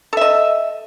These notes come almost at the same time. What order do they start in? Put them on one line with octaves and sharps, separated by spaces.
A4 E5 D#5